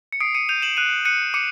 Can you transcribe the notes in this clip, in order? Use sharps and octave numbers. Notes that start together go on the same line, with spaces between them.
C#7
D#6 C7 D7
C#7 D#7
G6 D#7 F7
E7 F#7
F#6 D#7 F7
F#6 C#7 D#7
D6 C#7 D#7